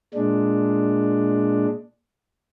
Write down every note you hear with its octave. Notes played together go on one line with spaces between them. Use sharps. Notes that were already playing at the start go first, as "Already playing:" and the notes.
A#2 G#3 D4